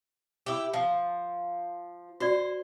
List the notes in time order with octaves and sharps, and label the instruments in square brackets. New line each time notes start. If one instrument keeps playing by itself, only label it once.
[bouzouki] E4 G4
F3
[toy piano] F#4 D5 [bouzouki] C5